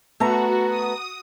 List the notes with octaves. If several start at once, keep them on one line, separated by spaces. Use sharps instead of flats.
A3 B3 F#4 A#5
D#6